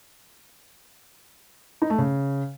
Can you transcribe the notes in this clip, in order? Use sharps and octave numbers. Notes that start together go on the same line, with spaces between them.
D#4
A3
C#3